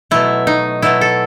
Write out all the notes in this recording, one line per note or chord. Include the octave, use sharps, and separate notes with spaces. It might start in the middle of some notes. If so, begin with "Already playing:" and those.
B2 F#3 A3 E4
D#4
B2 F#3 A3 E4
A4